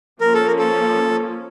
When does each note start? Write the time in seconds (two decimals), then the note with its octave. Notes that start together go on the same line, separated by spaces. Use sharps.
0.21 F3 A#3 C#4 A#4
0.34 A4
0.47 A#4
0.59 A4